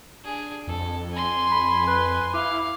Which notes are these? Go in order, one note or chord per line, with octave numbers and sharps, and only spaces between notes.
D4 G#4
F2 A4
G#5 C6
B5
B4
E4 F5 D6